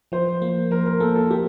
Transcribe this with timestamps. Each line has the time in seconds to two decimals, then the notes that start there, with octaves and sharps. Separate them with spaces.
0.12 F3 C5
0.42 A#3
0.71 F3 A#4
0.86 A#4
1.00 A#3 A4
1.15 A4
1.30 A#3 G4